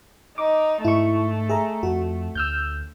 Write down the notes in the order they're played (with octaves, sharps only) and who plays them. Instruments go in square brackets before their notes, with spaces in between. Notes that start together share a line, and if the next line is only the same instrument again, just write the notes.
[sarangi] D#4 [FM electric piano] D6
[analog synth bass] G#2 [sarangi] A3 [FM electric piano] E4 C#6
[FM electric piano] G#4 E5 A#5
[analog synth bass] F2 [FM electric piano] F#4
[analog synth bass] D2 [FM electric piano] E6 F6 G6